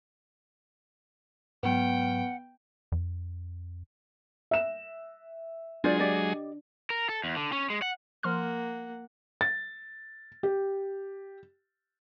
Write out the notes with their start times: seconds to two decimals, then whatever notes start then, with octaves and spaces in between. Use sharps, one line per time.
1.63 G#2 F#3 B3 B4 F#5 G5
2.92 F2
4.51 E5 E7
5.84 F#3 G#3 D4 F4 G#4 C5 D5
5.99 G4 D5 D#5
6.90 A#4
7.09 A4
7.24 E2
7.36 D3
7.53 C#4
7.70 G#3
7.82 F#5
8.23 F3 A#3 F#5 C6 F6
9.41 A6
10.43 G4